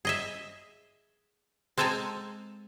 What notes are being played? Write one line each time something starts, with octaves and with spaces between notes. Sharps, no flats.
G#4 D#5 E5
G#3 C4 A4 G#5 A#5